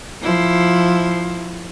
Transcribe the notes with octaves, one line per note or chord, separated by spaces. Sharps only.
F3 E4